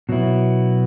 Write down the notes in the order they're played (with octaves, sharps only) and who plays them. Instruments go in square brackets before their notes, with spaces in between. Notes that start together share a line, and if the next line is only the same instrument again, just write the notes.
[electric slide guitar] B2 F#3 B3 E4